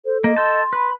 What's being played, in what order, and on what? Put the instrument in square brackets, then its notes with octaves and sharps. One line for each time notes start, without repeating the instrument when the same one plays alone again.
[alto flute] A4 [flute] C5
[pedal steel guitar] A#3 [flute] D#5
[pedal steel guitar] A4 G5 A5 [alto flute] C6
[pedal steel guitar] B4 [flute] B5